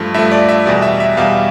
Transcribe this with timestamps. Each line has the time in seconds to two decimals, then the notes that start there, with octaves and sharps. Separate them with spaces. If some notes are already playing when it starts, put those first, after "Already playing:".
Already playing: G2 F3 A3
0.14 G2 F3 A3 E5
0.32 D5
0.49 E5
0.66 E2 B2 G3 D5
0.82 E5
1.00 E5
1.17 E2 B2 G3 F5